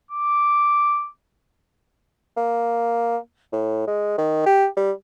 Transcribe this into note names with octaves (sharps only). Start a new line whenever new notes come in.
D6
A#3
A2
G#3
D#3
G4
G3